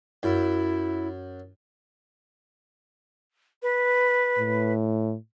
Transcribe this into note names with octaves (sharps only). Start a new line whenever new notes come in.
F#2 E4
B4
A2